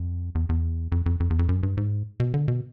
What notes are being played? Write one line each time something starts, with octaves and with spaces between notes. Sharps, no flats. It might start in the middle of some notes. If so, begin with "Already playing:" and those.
Already playing: F2
E2
E2
F2
F2
F2
E2
F2
F#2
G2
G#2
B2
D3
B2